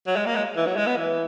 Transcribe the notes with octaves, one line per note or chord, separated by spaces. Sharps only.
F#3
G#3
A#3
G#3
E3
F#3
G#3
B3
E3